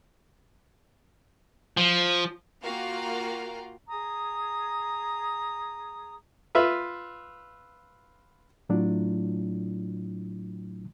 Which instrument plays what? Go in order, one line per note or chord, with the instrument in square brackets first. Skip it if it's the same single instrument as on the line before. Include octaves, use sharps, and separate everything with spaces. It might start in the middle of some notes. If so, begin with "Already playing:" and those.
[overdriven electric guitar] F3
[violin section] A#3 F4 F#4 F5 G5 A#5
[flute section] G#4 A#5 D#6
[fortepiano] F4 B4 E5
[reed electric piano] A2 F#3 A3 D4 E4 F4